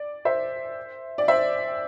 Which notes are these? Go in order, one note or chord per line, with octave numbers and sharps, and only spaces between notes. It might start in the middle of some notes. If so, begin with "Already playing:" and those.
Already playing: D5
C5 E5
D5
C5 E5